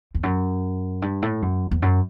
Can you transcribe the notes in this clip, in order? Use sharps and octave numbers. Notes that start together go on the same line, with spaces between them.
E2
F#2
G2
A2
F#2
E2
F#2